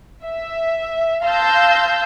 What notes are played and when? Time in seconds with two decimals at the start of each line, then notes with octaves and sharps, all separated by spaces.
0.22 E5
1.25 F5 A5 C6 E6 G6 A#6